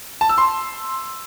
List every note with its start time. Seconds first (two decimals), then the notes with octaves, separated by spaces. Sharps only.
0.21 A5
0.29 E6
0.38 C6